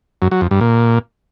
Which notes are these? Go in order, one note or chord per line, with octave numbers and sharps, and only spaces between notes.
F#2
F#3
F2
G2
A#2